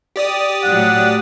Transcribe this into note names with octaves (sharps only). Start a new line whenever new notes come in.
G4 D5 D#6
A2 F#3 F#5